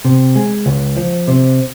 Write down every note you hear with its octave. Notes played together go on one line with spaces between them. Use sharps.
C3
G#3
C#2
F3
C3